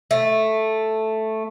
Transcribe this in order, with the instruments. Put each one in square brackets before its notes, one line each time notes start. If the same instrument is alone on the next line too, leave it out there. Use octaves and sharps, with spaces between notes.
[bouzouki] A3